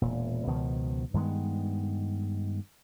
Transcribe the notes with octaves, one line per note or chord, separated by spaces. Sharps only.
E1 A#2
C#2 B2 D#3 F3
G2 D#3 G#3 B3